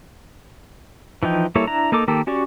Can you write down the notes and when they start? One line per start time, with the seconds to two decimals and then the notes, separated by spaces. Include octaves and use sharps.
1.23 E3 F3 D#4 G5
1.55 G3 A#3 E4 A4 C#5
1.67 D4 E4 A#5
1.92 A#3 D#4 A4 D6
2.08 D#3 A#3 G4 A4
2.27 C#4 F#4 G4 D5 C#6